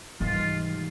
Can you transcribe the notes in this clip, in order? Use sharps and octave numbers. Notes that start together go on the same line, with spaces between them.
G#2 C3 E3 G3 F4